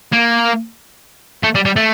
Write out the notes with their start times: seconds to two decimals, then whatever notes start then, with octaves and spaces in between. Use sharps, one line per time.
0.13 A#3
1.43 A3
1.55 G3
1.65 G3
1.76 A3